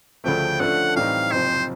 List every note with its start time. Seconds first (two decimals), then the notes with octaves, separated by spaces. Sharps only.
0.24 D2 C#3 F3 A3 G5
0.60 D3 F3 A3 C#4 F#5
0.96 A2 E3 G3 C4 D#4 F5
1.31 F#1 F2 C3 F3 C5